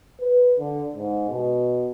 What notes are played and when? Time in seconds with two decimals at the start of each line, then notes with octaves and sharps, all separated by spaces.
0.20 B4
0.59 D3
0.96 G#2
1.29 B2